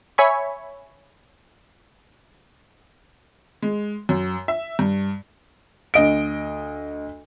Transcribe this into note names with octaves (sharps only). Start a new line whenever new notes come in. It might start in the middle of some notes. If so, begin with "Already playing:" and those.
C#5 E5 G#5 B5 C#6
G#3
F#2
E5
G2
D2 D#5 D7